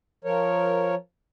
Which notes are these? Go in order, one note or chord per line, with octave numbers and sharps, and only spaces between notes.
F3 A#4 C#5